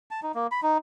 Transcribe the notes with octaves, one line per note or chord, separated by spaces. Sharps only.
A5
D#4
A#3
B5
D#4